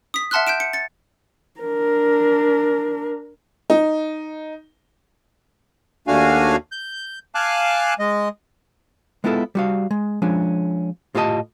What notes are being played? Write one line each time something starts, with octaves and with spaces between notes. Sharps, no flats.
D#6 B6
E5 F#5 A5 C6 F6 F#6
G6 B6 D7 E7
C#7
A6 C#7
D4 A#4
D#4
D#2 A3 D4 F#4 F5 G#5
G6
F5 G#5 A5 D6 F#6
G#3 D#5
G#3 B3 E4 F4 G4 A4
G3 F#4 F5
G#3
F3 G#3 C#4 D4
A2 F4 G4 A4 D#5 A5